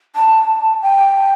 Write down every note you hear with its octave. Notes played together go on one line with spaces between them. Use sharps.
A5
G5